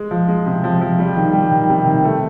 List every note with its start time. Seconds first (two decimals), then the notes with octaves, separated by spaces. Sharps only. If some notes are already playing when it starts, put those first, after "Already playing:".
Already playing: G#3
0.11 F3
0.28 G#3
0.46 C3
0.64 F3
0.81 F3
0.99 G3
1.16 D#3
1.33 G3
1.51 D#3
1.69 C3
1.86 D#3
2.04 A3